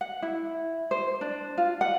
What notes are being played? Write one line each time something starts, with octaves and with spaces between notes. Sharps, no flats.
F#5
E4
C5
D4
F4
F#5